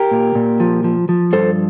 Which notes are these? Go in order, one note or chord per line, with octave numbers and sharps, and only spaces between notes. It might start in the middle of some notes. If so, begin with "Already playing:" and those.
Already playing: G4 A#4
A#2
A#2
F3
F3
F3
G2 A4 C5